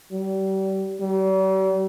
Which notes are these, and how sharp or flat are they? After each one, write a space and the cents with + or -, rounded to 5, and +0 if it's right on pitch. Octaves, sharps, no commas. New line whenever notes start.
G3 -30
G3 -45